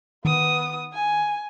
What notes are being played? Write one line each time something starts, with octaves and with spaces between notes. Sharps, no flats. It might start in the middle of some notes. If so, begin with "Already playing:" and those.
D#3 B3 D#6
G#5